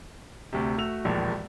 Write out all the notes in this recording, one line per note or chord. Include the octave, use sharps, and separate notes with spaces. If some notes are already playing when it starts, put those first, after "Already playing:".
D2 C3
A3 F#4 E6 F7
E1 A#1 D#2 A#2